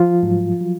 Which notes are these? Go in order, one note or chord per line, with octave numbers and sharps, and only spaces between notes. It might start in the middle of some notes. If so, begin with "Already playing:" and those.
Already playing: F3 F4
G#2 F#3
F#3